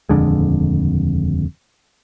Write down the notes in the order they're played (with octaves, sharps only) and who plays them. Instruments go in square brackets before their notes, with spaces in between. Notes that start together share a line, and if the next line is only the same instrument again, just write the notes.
[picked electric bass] D#1 F2 D3 G#3